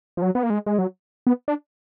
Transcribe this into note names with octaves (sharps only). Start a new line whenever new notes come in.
F3
F#3
B3
A#3
G#3
G#3
F#3
B3
D4